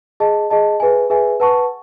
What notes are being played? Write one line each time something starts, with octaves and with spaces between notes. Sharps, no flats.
G#4 D#5 A5
G#4 D#5 A5
G#4 B4 E5 G#5
G#4 B4 E5 G#5
B4 F#5 A5 C#6